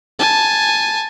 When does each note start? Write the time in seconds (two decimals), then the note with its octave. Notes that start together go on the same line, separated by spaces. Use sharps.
0.19 G#5 A5